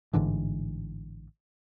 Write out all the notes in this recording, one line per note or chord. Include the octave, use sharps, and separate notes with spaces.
A1 G#2 D3 E3